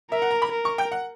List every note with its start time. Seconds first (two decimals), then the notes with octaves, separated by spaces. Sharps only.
0.11 A#4 E5
0.22 F#5
0.31 A#5
0.42 B5
0.51 A#4
0.65 C#6
0.78 G5
0.92 F#5